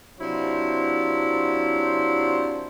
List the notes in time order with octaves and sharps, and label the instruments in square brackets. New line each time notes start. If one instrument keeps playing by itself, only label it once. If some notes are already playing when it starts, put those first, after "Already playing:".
[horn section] C3 F#3 D4 E4 F4 C5